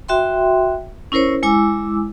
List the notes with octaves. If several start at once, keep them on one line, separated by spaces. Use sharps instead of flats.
F#4 E5 G5 C6
C#4 E4 A#4 C5 C#5
G#3 E4 G#5 D6 E6